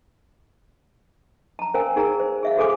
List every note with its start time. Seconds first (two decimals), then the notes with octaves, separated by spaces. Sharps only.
1.59 A5 A#5
1.74 C#4 A#4 C5 F5 G#5 A5
1.96 D#4 G#4 A#4 A#5
2.20 C5
2.43 G#4 E5 F5
2.57 F#4 G#4 A4 C5 G#5 D6